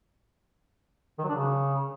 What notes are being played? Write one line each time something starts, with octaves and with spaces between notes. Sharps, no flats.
D#3
F#3
D4
C#3